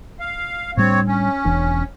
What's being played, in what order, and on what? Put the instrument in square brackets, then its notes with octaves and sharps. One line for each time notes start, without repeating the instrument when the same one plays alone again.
[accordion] F5
[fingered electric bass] A2 G3 D4 [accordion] C4 C#5
[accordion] C#4
[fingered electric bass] E1 E3 D4